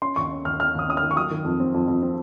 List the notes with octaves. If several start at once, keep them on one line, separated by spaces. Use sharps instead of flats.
C#4 C6
D#2 C#6
C#4
D#2 F6
C#4 F6
D#2 D#6
C#4 D#6
F6
D#3
C#6
F#3 D#6
D#3
F2
C4
F2
F2
C4